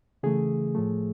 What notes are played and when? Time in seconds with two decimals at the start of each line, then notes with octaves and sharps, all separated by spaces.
0.23 C#3 E3 A3 G#4
0.75 A2 F3 A3